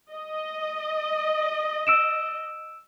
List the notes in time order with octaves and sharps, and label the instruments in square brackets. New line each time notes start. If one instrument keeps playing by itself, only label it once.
[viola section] D#5
[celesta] E6 D7 E7